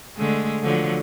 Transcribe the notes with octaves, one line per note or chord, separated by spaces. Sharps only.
D3 G#3 A3
D3 F3 F#3